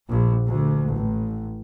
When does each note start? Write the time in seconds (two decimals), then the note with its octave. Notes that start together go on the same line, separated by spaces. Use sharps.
0.11 A#1
0.48 D2
0.95 A1